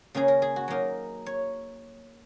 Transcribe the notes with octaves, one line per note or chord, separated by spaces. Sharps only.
C#3 A#3 C#4 G#4
A#4
G#4
F#4
F#3 A#3 D#4 A#4
C#5